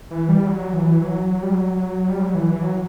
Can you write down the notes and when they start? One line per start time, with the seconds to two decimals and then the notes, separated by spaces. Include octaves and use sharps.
0.11 E3
0.29 G3
0.47 F#3
0.73 E3
1.01 F#3
1.43 G3
1.54 F#3
2.08 G3
2.22 F#3
2.35 E3
2.48 E3
2.62 F#3